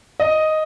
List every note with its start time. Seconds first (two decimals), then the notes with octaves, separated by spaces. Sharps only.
0.20 D#5